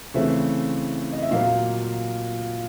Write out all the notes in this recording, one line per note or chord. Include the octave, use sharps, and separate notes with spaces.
C#3 E3 A3 C4 E5
D#5
E5
A#2 F#3 A#3 F5